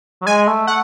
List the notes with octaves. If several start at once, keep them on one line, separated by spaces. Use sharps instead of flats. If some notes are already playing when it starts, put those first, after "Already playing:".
F#3
G#3 G#5
A3
A3 F#5